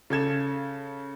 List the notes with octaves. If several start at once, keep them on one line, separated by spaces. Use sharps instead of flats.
C#3 A4 G#6 E7